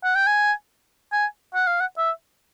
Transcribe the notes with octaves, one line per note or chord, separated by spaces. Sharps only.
F#5
G5
G#5
G#5
F#5
F5
F#5
E5